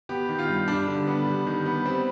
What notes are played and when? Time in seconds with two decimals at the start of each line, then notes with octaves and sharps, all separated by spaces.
0.09 B3 G4
0.29 D#3
0.39 F4
0.48 G2
0.68 G3 D4
0.87 D3
1.07 B3
1.26 G3
1.46 D#3
1.66 B3
1.86 G3 C4